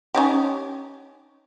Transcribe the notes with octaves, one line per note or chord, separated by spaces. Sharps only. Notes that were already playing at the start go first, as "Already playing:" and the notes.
C#4 D#4 G4